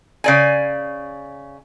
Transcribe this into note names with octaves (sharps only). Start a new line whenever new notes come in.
C#3 D5 G#5